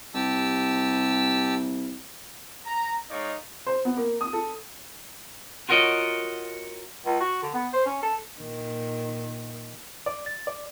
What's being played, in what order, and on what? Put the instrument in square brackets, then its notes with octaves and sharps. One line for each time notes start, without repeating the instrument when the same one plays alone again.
[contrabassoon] C2 [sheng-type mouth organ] G4 A5 E6
[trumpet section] A#5
G#3 D#4 C#5 D5 F5
[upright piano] C5
B3
A#3
D#6
A4
[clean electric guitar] F4 F#4 A#4 C#5 D#5
[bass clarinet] C#2
F#4
D3
B3
C5
C#4
A4
[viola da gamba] A#2 D#3
[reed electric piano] D5
A6
D5